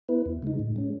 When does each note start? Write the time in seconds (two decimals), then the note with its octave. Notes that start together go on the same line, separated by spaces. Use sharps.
0.09 B3 E4 B4
0.26 E2
0.43 C#3 G#3 D#4
0.59 A2
0.76 G#3 C#4